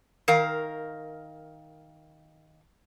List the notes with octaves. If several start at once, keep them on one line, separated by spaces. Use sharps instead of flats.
D#3 A#4 F5